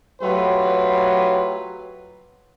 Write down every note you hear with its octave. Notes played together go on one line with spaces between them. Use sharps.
F#3 A3 F4 G4 B4